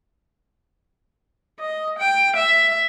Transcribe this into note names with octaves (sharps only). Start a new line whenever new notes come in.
D#5
G5
E5